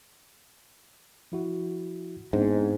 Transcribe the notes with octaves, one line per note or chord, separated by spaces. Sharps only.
F3 E4 F#4
G#2 B3 C4 D4